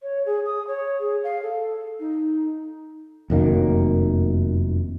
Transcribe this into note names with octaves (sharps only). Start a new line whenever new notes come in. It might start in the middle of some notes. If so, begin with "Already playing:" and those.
C#5
G#4
D#6
C#5
G#4
F5
A4
D#4
F1 F#2 D#3 A#3